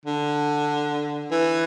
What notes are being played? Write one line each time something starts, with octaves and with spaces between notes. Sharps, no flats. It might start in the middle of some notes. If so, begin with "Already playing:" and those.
D3
E3